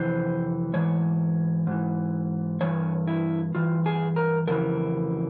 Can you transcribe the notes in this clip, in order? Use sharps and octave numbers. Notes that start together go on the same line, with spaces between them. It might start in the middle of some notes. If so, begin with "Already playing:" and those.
Already playing: F2 C3 E3 C5
G#2 E3 C#5
G#2 E3
G2 E3 C#5
E4
G2 E3 F4
G#4
A#4
F2 C#3 E3 A#4